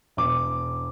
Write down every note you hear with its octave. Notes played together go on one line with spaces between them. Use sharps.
E1 D6